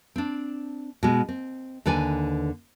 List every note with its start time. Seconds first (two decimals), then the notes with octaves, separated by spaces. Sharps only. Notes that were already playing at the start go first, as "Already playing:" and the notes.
0.16 C4 D4
1.03 B2 G#3
1.29 C4
1.86 D#2 D3 B4 D5 G#5